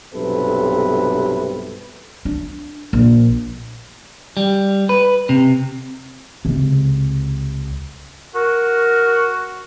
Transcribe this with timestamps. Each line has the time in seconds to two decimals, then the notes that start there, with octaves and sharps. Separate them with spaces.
0.14 B1 G2 C3 A4 B4
2.25 D4
2.93 A#1
4.37 G3
4.89 B4
5.29 C3
6.45 C#2 C3
8.35 F#4 A#4